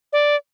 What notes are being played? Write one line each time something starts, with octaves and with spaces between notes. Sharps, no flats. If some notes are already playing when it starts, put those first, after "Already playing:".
D5